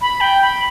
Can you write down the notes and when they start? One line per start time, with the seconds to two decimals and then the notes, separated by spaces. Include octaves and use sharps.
0.01 B5
0.21 G5
0.42 B5